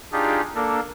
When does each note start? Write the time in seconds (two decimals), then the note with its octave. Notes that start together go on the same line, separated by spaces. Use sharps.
0.12 D4 D#4 F4 G4 G#4
0.55 A#3 D4 A4 A#4